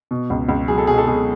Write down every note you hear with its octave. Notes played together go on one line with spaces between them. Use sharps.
B2
C#2
C#2
F#3 G#4
A4
B2 G#4
A4
B2 G#4